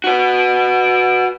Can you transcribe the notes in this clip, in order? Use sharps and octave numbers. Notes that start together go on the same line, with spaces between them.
F#4 B4